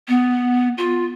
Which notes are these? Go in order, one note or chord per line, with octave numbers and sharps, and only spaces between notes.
B3
F4